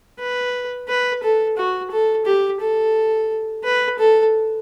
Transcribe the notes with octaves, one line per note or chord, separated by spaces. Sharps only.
B4
B4
A4
F#4
A4
G4
A4
B4
A4